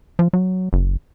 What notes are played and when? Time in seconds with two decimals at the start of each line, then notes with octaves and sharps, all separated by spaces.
0.19 F3
0.33 F#3
0.73 F#1